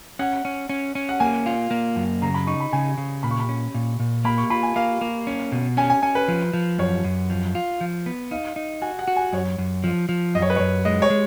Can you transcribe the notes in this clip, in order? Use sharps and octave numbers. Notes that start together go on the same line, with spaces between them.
C#4 F#5
C#4
C#4
C#4
F#5
A#3 G#5
F4
A#3
F#2
C#3 A#5
B5
D#4 C#6
B5
C#3 G#5
C#3
A#2 B5
C#6
B5
C#4
A#2
A#2
A#3 B5
C#6
F4 B5
G#5
A#3 F5
A#3
C#4
B2
C#4 G#5
G#5
C#4 G#5
B4
F3
F3
F#2 C#5
F#2
F3
F4
F3
B3
D#4 F5
D#4
F#4 G#5
F#5
F#4
G#5
F#2 C#5
F#2
F3
F3
F#2 D#5
C#5
B4
F#2 C#5
G#3 D#5
C#5
G#3